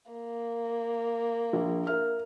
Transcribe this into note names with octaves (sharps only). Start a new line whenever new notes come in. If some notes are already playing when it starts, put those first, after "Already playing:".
A#3
A#1
A#4 E5 F6